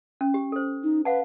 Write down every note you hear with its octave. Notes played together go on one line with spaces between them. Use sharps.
C#4
G4
A4 C5
D#4
B4 F5 F#5 A5